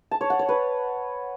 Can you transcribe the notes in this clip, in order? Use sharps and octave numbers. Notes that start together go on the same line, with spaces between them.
A5
C#5
F#5
C#5
B4